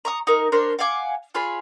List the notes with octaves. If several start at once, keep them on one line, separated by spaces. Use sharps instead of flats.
A#5 C#6 D#6
D#4 A#4
D4 A#4 C5 C#5
F5 F#5 G#5 D6
F4 G#4 C#5 B5